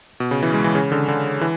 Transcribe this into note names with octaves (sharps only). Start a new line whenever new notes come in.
B2
C#3
E3
G#3
E3
C#3
D3
D3
E3